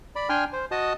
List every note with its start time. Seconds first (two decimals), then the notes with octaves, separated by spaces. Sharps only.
0.16 D5 B5
0.29 D4 G5 G#5 C6 F6
0.53 C5
0.71 F#4 D#5 A5 D#6